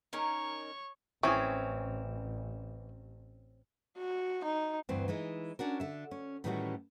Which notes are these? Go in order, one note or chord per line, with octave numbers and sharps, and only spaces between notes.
C#4 D#4 A#4 C#5 C#6
A1 E3 C4 C#4 G#4 C#6
F#4
D#4
D2 G2 E3 C4
E3 G#3 D#4 E4
C#4 D4 F#4 A#4
D3 E5
C#4
A2 D#3 E3 G3 C#4 F#4